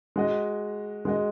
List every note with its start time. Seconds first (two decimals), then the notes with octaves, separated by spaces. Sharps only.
0.16 G#3 F#4 D#5
1.05 G#3 F#4 D#5